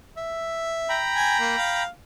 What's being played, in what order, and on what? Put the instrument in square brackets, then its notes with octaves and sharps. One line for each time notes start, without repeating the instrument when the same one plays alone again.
[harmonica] E5
[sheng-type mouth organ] G5 A#5 B5
[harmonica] G#5
A#3
F5